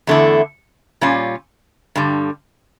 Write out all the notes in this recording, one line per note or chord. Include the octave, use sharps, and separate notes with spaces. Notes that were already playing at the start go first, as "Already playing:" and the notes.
E2 D3 A3 E4
A#2 G3 C#4 F4
G2 D3 G3